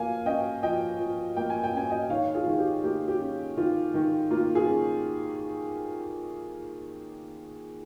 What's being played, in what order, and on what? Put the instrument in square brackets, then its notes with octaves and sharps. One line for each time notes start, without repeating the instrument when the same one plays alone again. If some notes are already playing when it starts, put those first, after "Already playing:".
Already playing: [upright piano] F3 A#3 F5 G#5
C#4 D#5 G5
F3 D#5 G5
F3
A#3 G5
G#5
G5
C#4 G#5
D#5 G5
D#3 C#5 F5
F4 G#4
D#3
G4
A#3 G4
G4
C#4
D#3 F4
D#3
A#3 F4
F4 G#4
C#4